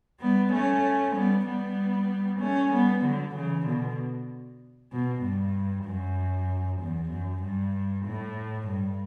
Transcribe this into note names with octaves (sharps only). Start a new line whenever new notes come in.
G3 B3
A3 C#4
G3 B3
G3 B3
A3 C#4
G3 B3
D3 F#3
C#3 E3
B2 D3
B2
G2
F#2
E2
F#2
G2
A2
G2